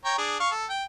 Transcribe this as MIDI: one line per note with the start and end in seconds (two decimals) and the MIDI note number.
0.05 0.16 73
0.05 0.16 79
0.05 0.16 82
0.18 0.38 62
0.18 0.38 68
0.40 0.50 77
0.40 0.50 85
0.51 0.66 69
0.70 0.84 79